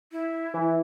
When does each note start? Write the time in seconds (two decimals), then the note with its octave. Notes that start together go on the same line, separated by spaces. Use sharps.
0.12 E4
0.54 E3